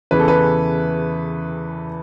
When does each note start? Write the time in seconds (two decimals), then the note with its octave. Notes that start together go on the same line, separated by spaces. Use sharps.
0.11 E2 C#3 E3 B4
0.20 A4
0.28 B4